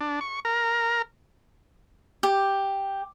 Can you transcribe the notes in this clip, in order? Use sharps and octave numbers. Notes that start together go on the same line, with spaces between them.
D4
C#6
A#4
G4